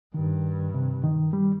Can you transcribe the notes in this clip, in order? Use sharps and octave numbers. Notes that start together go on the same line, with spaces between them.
G2 D#3
C3
D#3
G3